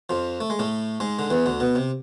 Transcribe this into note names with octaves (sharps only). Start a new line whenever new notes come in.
F2 F3
A3
G#3
A2 A3
G#2 G#3
D3
E2 E3
D2 D3
B2
C3